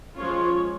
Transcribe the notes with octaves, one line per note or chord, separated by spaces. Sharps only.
F3 G#3 C#4 F4 C#5